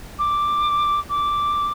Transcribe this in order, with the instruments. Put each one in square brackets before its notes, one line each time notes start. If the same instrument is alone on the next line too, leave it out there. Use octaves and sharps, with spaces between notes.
[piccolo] D6
D6